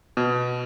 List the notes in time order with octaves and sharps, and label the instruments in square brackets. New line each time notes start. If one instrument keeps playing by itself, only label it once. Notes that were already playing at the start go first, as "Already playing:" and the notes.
[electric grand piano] B2